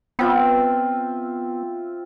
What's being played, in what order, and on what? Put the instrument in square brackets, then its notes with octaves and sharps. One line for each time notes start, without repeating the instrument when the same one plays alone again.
[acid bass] B3 [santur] C4 F4 E5